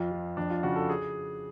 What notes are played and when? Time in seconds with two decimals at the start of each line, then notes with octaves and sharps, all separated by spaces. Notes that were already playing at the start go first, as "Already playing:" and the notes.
Already playing: F2 F3 F4
0.12 F3
0.37 F2 D4
0.50 F4
0.63 C#3 F#4
0.76 A4
0.90 G#4